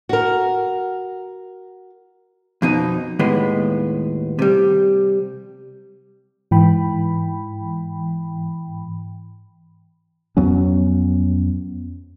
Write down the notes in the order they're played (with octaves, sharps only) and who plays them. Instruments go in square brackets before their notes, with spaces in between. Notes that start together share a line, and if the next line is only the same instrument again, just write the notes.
[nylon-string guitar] F#4 A#4
[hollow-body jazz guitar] F2 B2 D#4
D#2 A2 G#3 B3
C3 G3
[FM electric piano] G#2 E3 G5 B5
[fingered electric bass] F2 F#3 B3 C#4